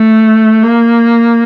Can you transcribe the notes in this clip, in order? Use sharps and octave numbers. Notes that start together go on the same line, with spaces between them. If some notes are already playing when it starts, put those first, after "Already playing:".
Already playing: A3
A#3